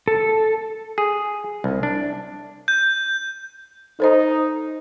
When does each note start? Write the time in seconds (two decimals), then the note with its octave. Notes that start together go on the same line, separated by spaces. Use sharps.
0.08 A4
0.98 G#4
1.64 C2
1.83 D4
2.68 G6
4.00 D#4 A4 C5 D#5